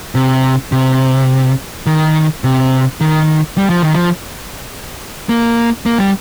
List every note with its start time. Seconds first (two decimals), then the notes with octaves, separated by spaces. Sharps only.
0.15 C3
0.72 C3
1.86 D#3
2.44 C3
3.01 D#3
3.58 G3
3.70 F3
3.83 D#3
3.94 F3
5.29 A#3
5.86 A#3
5.99 G3